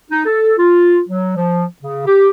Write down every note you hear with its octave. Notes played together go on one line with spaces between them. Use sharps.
D#4
A4
F4
F#3
F3
C#3
G4